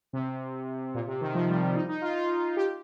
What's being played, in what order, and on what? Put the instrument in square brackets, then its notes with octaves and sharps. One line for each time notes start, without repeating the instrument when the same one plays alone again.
[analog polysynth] C3
A#2
C3
D#3
F3
G3
G3
D#4
D#4
F4
F4
G4